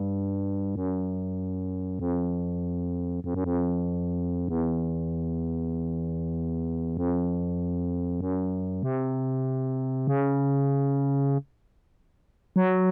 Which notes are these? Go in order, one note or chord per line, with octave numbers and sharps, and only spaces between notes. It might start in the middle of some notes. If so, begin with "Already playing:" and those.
Already playing: G2
F#2
F2
F2
F#2
F2
E2
F2
F#2
C3
C#3
F#3